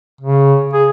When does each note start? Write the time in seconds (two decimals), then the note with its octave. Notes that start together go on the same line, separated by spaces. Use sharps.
0.21 C#3
0.73 G#4